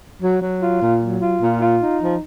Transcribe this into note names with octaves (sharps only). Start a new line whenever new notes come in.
F#3
F#3
F4
A#2
F#3
F4
A#2
F4
D#4
F3